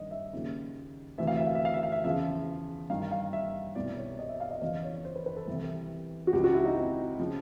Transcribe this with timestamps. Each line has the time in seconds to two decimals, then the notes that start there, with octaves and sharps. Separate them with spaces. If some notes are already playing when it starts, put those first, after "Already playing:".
Already playing: G2 D#3 D5 D#5
0.11 E5
0.33 D#2 C#3 F3
1.18 D2 C3 E3 E5
1.27 F5
1.37 E5
1.46 F5
1.55 E5
1.65 F5
1.74 E5
1.83 F5
1.92 E5
2.04 E2 C#3 F3 E5
2.90 G2 D#3 F5
3.11 F5
3.33 E5
3.75 C2 B2 D5
3.97 C#5
4.19 D#5
4.29 E5
4.40 F5
4.51 D#5
4.62 E2 C#3 F3 D#5
4.83 C#5
5.05 C5
5.16 B4
5.26 B4
5.37 A4
5.47 C2 C3 E3
6.27 F#4
6.33 C#2 C#3 F3 G4
6.44 F#4
6.55 E4
6.65 D#4
6.76 C4
7.19 C#3 F3